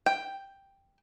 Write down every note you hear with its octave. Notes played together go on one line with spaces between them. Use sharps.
G5